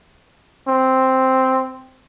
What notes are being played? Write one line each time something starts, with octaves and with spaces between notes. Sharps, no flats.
C4